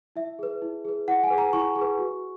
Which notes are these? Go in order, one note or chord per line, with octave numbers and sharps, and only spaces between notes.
E4 E5
G#4 B4
E4
G#4 B4
E4 F#5
G#5
G#4 B4
A#5
E4 C#6
G#4
B4
F#4